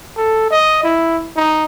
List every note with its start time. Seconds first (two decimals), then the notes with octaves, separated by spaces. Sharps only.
0.17 A4
0.51 D#5
0.84 E4
1.36 D#4